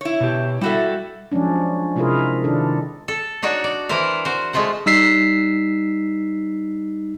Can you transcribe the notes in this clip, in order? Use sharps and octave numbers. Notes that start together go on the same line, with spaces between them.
E4 C#5
B2 G4
G3 E4 F#4 A4 E5
F3 F#3 G#3 C#4 D4
C3 G#3 E4 F4 G#4 A#4
D#3 D4 A4
A4
D4 D#4 F#4 C#5 D5
D5
E3 E4 A#4 C5 F5
F#4 C5
G#3 A3 F4 C5 F#5
G3 D#4 E6 B6 C7